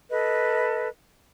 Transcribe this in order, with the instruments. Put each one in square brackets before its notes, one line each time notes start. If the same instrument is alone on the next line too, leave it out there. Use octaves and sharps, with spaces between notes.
[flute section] A4 B4 D#5